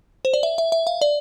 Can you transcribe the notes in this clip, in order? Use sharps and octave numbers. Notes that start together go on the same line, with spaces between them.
C5
D5
E5
E5
E5
F5
D5